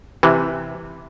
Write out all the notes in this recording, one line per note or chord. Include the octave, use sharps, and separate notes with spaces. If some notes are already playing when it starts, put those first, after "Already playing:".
C3 E3